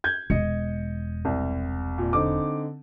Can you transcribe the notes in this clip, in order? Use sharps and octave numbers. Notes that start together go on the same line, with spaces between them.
G6 G#6
E1 D#5 C#7
C2
A#2
D3 C4 D#4 D6